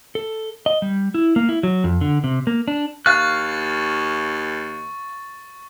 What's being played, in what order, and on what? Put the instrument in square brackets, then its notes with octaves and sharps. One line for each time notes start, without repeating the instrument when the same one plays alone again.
[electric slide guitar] A4
D#5
G3
E4
A#3
E4
F#3
F2
D3
C3
A#3
D4
[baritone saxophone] D#2 [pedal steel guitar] F5 F#6 [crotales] C#6 A6